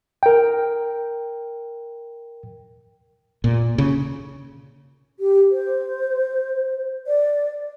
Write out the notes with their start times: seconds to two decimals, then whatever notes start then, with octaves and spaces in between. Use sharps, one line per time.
0.23 A#4 G5
3.44 A#2
3.78 C#3
5.19 G4
5.51 C5
7.07 D5